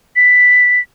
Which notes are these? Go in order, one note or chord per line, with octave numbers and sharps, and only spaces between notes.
B6